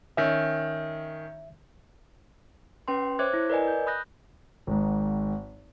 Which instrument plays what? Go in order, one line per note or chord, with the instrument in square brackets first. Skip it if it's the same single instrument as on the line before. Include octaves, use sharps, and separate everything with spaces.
[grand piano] D#3 C#4 [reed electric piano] E5
[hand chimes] C#4 B4 G5 C6
C5 C#5 E5 D6 F#6 G#6
E4
A#4 B4 D5 D#5 G#5
G6
B5 D#6 F#6 G6 A#6
[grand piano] G#1 G#2